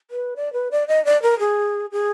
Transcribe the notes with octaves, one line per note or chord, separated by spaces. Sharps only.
B4
D5
B4
D5
D#5
D5
A#4
G#4
G#4